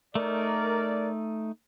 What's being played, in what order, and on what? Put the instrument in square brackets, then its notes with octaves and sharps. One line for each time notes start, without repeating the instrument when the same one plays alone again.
[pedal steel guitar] A3 D#4 [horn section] A#4 D5